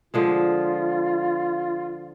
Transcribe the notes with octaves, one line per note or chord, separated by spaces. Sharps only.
D3 F3 G#3 F4